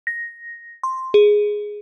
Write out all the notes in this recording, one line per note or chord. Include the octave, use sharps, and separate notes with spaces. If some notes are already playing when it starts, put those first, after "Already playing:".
A#6
C6
G#4